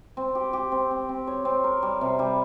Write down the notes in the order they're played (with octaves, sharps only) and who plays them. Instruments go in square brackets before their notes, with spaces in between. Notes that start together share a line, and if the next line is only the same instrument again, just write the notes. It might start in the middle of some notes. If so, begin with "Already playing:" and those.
[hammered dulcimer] C4
G4
G4
C4
C4
C4
C#5
C4
A#4
G3
C3
G3